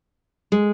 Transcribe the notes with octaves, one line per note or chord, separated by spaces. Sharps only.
G#3